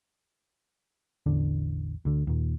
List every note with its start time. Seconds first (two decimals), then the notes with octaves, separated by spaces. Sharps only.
1.26 A1 E2 D3 D4
2.05 D2 D3
2.27 D#2 A#2